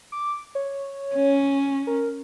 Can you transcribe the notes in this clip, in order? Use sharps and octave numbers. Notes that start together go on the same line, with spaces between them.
D6
C#5
C#4
A#4